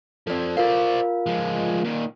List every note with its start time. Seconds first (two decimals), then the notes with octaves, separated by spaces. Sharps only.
0.27 F3 C4 A4 D5
0.57 F4 A#4 C5 D5 F5
1.26 F3 G#3
1.85 A#2 D#3